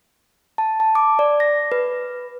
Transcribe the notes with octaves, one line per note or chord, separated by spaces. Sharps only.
A5
A5
D6
D5
A#6
B4